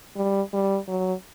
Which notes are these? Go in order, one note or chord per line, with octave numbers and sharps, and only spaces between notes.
G3
G3
F#3